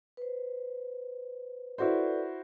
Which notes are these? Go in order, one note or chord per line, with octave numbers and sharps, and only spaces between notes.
B4 C5
E4 F#4 A4 B4 C5 D5